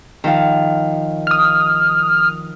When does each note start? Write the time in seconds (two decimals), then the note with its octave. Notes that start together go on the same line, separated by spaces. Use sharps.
0.24 D#3 F3 F5
1.27 D#6 F6